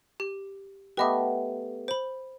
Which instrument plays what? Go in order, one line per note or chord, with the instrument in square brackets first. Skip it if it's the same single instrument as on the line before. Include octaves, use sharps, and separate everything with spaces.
[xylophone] G4
[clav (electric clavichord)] A3 B3 G4 [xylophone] B4 D#5 E5
[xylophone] C5 B5